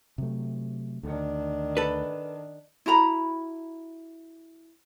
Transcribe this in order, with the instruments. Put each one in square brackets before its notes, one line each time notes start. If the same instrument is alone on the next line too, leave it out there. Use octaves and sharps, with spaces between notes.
[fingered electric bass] C3 F#3 A3
[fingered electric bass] D2 [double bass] D#3 D4
[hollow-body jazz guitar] A4 B4
[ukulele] E4 F#4 A#5 B5